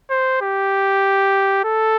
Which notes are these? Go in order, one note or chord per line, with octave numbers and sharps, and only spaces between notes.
C5
G4
A4